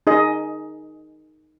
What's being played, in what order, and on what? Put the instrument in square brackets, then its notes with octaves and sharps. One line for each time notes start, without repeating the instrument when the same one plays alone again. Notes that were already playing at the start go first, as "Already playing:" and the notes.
[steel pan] D#4 G#4 D#5